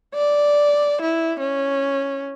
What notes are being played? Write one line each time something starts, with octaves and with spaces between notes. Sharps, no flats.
D5
E4
C#4